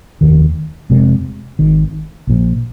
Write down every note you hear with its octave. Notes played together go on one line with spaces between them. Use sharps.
F1 D#2 D#3
F1 F2 C3 G#3
G#1 G#2 D#3
A#1 A#2 F3